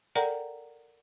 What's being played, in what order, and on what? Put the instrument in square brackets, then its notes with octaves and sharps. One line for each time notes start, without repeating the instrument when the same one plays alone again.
[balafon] A4 A#4 D5 F#5 G5 A#5